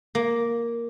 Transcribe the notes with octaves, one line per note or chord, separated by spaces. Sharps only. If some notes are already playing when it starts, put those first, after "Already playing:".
A#3